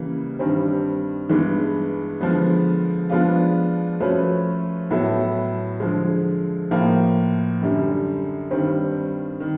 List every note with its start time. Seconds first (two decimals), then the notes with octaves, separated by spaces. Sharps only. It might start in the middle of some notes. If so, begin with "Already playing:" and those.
Already playing: C#3 E3 G3 A#3
0.39 G2 D#3 G3 C4
1.29 G2 E3 G#3 B3
2.21 D3 F3 G#3 B3
3.10 F3 G#3 B3 D4 F4
4.00 F3 A3 C#4 F#4 B4
4.90 A2 F#3 B3 E4 A4
5.80 D3 F3 G#3
6.71 A2 F3 A#3
7.61 F#2 D3 G3
8.51 G2 D#3 G3 C4
9.40 D#3